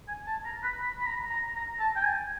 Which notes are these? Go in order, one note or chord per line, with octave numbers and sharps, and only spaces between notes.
G#5
A5
A#5
B5
B5
B5
A#5
A#5
A#5
A5
G5
G#5